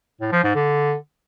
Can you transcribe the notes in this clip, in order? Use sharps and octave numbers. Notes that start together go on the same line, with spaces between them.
A2
F3
G#2
D3